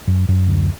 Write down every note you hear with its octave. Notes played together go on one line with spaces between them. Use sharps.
F#2
F#2
D2